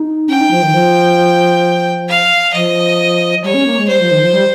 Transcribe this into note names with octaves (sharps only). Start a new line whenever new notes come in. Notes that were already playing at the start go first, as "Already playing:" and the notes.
Already playing: D#4
C#4 G5
D#4
F3
D#3
F3
F5
F3 D#5
G3 C#5
C#4
A#3
G#3
G3 C5
F3
D#3
F3
G3